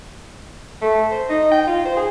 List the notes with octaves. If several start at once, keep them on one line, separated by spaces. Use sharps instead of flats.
A3
C5
D#4
G5
F4
C5
G#4